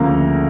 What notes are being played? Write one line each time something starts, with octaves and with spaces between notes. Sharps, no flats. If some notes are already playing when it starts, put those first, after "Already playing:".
Already playing: D2 C#3 F3 A#3 A#5